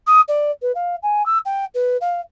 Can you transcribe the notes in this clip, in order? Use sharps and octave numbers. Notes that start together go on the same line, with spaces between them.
D#6
D5
B4
F5
G#5
E6
G5
B4
F5